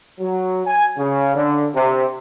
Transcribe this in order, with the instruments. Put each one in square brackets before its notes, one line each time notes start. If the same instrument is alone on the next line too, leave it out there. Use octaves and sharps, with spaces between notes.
[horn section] F#3
G#5
C#3
D3
C3